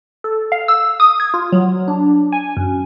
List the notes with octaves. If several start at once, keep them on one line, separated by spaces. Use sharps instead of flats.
A4
F5
E6
D#6
G#6
F4
F#3
D4
G#5
F#2